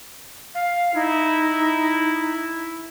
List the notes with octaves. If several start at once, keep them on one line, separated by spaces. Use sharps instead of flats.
F5
D#4 E4